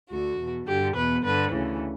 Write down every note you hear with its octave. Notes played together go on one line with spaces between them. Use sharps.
D2 D3 F#4
E2 B2
G2 D3 G4
E2 B2 B4
G2 D3 B4
D2 C#3 E3